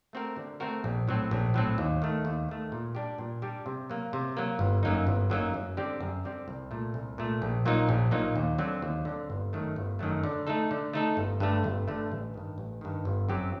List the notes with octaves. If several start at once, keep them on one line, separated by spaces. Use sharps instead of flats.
A3 C4 F#4 A#4
D3
A3 C4 F#4 A#4
A#1
A2 F#3 C4
A#1
A2 F#3 C4
D#2
D#3 A3
D#2
D#3 A3
A#2
G3 D4 G4
A#2
G3 D4 G4
C3
F#3 A#3
C3
F#3 A#3
G1
F#2 F#3 A#3 D#4
G1
F#2 F#3 A#3 D#4
F#2
D3 G3 C4 G4
F#2
D3 G3 C4 G4
C2
A#2 A3
C2
A#2 A3
A#1
A#2 F#3 A#3 D#4
A#1
A#2 F#3 A#3 D#4
D#2
D3 F#3 C4
D#2
D3 F#3 C4
G1
F#2 D#3 F#3 A3
G1
F#2 D#3 F#3 A3
D3
A3 D#4 A4
D3
A3 D#4 A4
G1
G2 D3 A3
G1
G2 D3 A3
A1
G2 D#3
A1
G2 D#3
G1
F#2 F#3 C4 G4